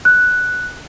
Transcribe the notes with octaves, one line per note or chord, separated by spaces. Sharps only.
F#6